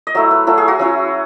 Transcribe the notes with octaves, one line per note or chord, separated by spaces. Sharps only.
D#5
F#3 A3 E4 E5
B4
F#3 A3 E4 A4
G#4
F#4
F#3 C#4 E4